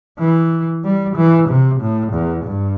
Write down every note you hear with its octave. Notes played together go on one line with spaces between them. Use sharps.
E3
G3
E3
C3
A2
E2
G2